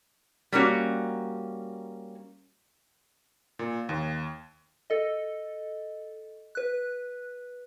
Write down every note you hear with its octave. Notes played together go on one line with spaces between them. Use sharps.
G3 A#3 C#4 F#4
A#2
D#2
A4 D#5
B4 F#6